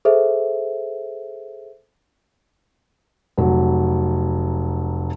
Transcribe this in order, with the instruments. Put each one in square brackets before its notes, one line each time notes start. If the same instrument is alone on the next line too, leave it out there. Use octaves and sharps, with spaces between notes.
[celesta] G#4 A4 C5 E5
[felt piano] F1 F#3